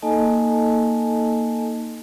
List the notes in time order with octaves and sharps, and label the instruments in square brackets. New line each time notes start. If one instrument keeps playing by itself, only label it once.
[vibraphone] A#3 D#4 A4 D#5 G#5 A5